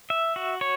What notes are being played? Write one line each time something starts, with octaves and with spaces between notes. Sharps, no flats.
E5
F#4
C#5